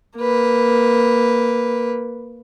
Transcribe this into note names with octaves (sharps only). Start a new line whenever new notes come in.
A#3 B4